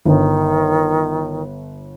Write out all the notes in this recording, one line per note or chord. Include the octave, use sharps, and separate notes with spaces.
G1 D#3